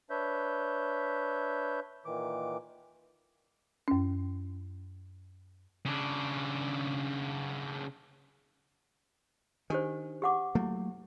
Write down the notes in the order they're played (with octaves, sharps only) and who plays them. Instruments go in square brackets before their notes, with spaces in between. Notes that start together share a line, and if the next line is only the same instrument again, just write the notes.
[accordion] D4 B4 C#5 E5 G6
A#2 D#3 E3 D6
[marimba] F#2 C#4
[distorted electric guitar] C#3 D4
[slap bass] D#3 [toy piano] D4 G4 C5
[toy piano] G4 F#5 D6
[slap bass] F#3 A3 A#3 [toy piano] E4